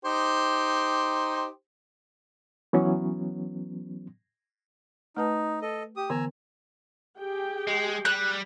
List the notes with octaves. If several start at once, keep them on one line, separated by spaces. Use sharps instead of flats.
D#4 G4 C5
E3 F#3 B3 C#4
A3 D#4 B4 A5
A4 D#5
G4 D#6
D3 E3 B3 G#5 A#5 E6
G4 G#4 G5
G#3
G3 F#6